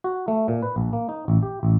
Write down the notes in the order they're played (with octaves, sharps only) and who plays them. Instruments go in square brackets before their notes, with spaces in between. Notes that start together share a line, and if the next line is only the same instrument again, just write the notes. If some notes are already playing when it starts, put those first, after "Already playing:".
[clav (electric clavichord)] F#4
A3
A#2
B4
A#1
A#3
D#4
A1
G4
A1